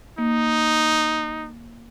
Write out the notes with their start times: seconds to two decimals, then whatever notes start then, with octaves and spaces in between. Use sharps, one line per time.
0.18 A#3 D#4